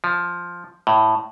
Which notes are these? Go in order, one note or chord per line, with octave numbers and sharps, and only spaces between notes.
F3
A2